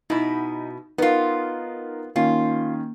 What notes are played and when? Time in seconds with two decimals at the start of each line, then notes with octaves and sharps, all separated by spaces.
0.10 B2 D#4 E4
0.98 B3 D#4 F4 A#4
2.16 D#3 A#3 C#4 F4